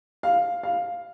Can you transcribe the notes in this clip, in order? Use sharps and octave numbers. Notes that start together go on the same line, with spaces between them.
F5
F5